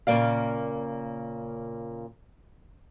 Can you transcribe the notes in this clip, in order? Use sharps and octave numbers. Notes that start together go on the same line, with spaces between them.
A#2 C#3 A#3 D5 F5